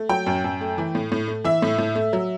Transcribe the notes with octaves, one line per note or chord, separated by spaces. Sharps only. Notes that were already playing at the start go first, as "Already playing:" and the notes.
Already playing: A3
F#3 G5
F#2
F#2
A3
E3
A2
A2
A3
E3 E5
A2
A2
A3
F#3